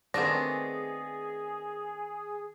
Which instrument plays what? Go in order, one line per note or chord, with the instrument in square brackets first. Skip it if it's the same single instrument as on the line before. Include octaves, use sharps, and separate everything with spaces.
[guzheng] D#3 A3 C4 [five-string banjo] B3 D4 [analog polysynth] G#4 [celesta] A#6